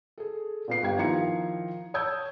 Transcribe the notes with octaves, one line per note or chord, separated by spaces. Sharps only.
G#4 A4
A#2 B3 C7
G1 G4 G#6
D#3 F3 E4 A#5 G#6 C#7
C#5 A5 D#6 E6 G6 G#6